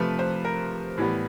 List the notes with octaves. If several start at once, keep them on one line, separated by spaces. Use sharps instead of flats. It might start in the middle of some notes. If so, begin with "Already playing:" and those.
Already playing: C3 F3 A3 B4
C5
A#4
A2 E3 G3 B3